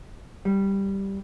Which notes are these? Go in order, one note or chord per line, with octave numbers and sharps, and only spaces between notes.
G3